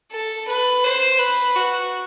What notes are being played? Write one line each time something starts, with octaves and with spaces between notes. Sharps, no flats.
A4
B4
C5
B4
F#4